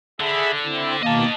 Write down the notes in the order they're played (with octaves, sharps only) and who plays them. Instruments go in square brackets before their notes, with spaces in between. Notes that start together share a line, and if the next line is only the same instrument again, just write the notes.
[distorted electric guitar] D3 [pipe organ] G#4 E5 B5
[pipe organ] C4 E4
[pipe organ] B2 D#3 [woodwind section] A#3 [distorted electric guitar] D#5 A5